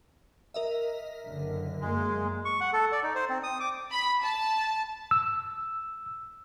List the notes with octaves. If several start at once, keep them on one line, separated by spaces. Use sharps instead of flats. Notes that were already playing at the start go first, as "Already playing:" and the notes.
A#4 D#5 E5
F#1 D3
F#2 G#3 A#3
C#6
F#5
A4
D5
D#4
C5
C4
D#6
D6
B5
A5
E6